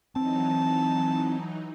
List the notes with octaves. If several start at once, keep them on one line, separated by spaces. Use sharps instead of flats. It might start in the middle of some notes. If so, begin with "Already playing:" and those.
E3 F#3 C4 D#4 A5